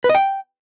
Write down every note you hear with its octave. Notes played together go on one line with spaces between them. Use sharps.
B4
D#5
G5